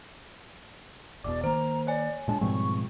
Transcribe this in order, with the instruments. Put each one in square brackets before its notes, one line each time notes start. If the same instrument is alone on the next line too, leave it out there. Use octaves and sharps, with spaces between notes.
[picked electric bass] E1 E2 B2 [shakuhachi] D5 [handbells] D6
[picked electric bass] D#3 A#3 [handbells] C5 [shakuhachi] A#5
[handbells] C#5 G#5 [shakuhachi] D5
[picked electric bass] A#2 G#3 D4 [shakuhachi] A5
[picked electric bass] G#2 G3 C4 [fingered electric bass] B2 F3 G#3 [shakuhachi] C#6